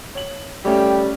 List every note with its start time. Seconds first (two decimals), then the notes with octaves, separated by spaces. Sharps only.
0.15 C#5 F#7
0.65 G3 A3 C#4 G5